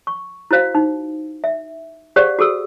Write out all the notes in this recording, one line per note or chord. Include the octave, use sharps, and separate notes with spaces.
C#6
E4 F#4 C5 F5
D#4
E5
G4 G#4 C5 D5 F5 F#5
F#4 G#4 A4 E6